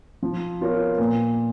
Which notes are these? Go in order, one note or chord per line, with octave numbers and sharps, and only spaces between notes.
F3
B3 F4 A#4 C#5
A#2